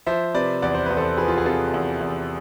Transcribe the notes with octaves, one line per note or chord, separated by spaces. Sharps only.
F3 C5 E5
C3 B4 D5
E2 D5
C5
E2 B4
A4 C5
F3 G#4 B4
F4
G#4
C3 F4 A4
E2
E2